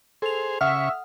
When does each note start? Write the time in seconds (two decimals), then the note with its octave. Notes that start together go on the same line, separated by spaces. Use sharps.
0.22 G#4 A4 C5 F7
0.61 C#3 E5 F#5 C#6 D#6 F6